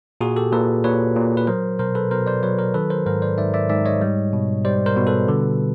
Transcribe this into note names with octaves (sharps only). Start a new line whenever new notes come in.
A#2 F#4 G#4
G4 A4
A#2 A4 B4
A#2 B4 C#5
A#2
B4
F#3 A#4 C5
B2 A#4 C5
A4 B4
B2 A#4 C5
C5 D5
F#3 B4 C#5
A#4 C5
D#3 A4 B4
A#4 C5
G#2 A#4 C5
C5 D5
G#2 D5 E5
D5 E5
G#2 D5 E5
C#5 D#5
G3
B2
G3 C5 D5
A#4 C5
B2
A4 B4
D3